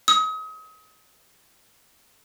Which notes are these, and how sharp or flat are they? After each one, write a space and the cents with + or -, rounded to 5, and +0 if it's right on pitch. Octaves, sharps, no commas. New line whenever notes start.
D#6 +35